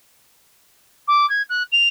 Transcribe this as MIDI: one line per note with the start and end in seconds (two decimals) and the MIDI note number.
1.07 1.28 86
1.29 1.42 92
1.49 1.63 90
1.72 1.88 101